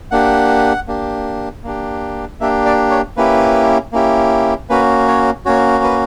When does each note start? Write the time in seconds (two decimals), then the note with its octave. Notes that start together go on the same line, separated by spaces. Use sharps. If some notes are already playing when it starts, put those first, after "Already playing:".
0.11 A#3 D4 G4 F#5
0.88 A#3 D4 G4
1.64 A#3 D4 G4
2.40 A#3 D4 G4 E5
2.66 D5
2.91 C#5
3.17 A#3 C#4 E4 G4 B4
3.93 A#3 C#4 E4 G4
4.70 A#3 C#4 F#4 B4
5.08 C#5
5.45 A#3 C#4 F#4 C#5
5.84 B4